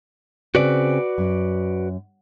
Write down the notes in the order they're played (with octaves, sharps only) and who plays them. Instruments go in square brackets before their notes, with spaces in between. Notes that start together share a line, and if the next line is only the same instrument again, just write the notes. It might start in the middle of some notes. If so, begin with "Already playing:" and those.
[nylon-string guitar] C#3 C4 [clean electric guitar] F#4 B4 D5
[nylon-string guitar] F#2